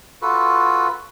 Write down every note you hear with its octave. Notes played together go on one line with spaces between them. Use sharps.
F4 F#4 A4 B4